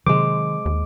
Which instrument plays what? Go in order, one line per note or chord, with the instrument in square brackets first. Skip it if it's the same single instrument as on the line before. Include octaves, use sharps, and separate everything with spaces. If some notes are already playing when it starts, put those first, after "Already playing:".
[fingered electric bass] C3 F#3 [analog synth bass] D#3 [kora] G#3 C5 [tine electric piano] D6
[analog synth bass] D#2